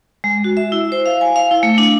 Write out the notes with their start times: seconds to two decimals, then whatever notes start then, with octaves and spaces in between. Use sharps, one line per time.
0.24 G#3
0.44 F#4
0.57 E5
0.72 E4
0.92 C5
1.06 F5
1.21 G#5
1.36 F5
1.51 E4
1.63 A3
1.78 D4